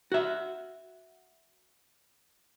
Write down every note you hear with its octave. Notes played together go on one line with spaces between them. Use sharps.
F#4 E5